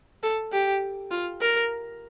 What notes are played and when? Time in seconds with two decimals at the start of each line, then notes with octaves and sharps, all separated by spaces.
0.23 A4
0.53 G4
1.11 F4
1.41 A#4